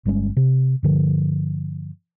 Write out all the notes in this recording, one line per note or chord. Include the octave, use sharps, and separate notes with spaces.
G1 G3 G#3 C#4
C3
G2 D3 F3